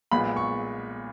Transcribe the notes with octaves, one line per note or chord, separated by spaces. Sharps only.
B1 A#2 G#3 B3 B5
C#6